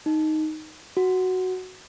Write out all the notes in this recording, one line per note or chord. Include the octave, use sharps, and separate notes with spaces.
D#4
F#4